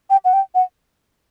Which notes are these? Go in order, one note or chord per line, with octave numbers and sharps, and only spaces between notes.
G5
F#5
G5
F#5